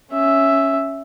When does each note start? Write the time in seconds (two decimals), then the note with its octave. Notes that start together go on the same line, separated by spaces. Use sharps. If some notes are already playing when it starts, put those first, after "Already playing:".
0.12 C#4 E5